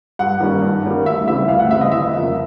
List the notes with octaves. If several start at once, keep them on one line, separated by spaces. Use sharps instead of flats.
G2 F#5
D#3 G3 A#3 C#4
G2
D#3 G3 A#3 C#4
D2 E5
C#3 E3 G3 C4 E5
D2 F5
F#5
C#3 E3 G3 C4 E5
D#5
G1 E5
F2 C#3 F3 A#3